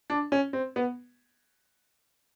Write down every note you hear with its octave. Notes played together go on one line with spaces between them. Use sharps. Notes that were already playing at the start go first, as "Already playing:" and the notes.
D4
C#4
C4
B3